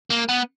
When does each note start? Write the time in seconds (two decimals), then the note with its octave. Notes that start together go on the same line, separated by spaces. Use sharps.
0.10 A#3
0.29 B3